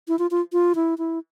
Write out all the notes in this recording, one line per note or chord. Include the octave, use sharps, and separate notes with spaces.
E4
F4
F4
F4
E4
E4